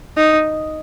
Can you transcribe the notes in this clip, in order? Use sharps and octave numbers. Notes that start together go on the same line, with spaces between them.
D#4